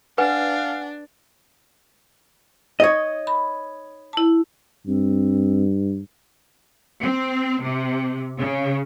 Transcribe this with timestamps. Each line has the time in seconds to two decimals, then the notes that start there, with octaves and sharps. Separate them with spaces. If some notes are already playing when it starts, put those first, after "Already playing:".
0.18 D4 B4 F5 F#5 G#5
2.80 D#4 C#5 D#5
3.27 B5
4.13 E4 A5
4.87 G2 C4
7.01 C4
7.62 C3
8.39 C#3